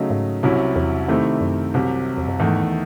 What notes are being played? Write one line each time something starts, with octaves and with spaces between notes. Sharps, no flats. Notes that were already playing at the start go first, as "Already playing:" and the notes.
Already playing: C#3 F#3 A3 D#4
G#2
C2 C3 F#3 C#4 E4
E2
C3 D#3 A3 C4 E4
F#2
C2 C3 F#3
E2
F#2
E2 G#2 D#3 A3